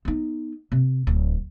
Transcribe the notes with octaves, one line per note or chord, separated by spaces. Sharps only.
B3 D#4
C3
D1